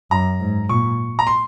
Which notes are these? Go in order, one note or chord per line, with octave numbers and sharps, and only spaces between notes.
F#2 A#5
G#2
A#2 C#6
A#5
C6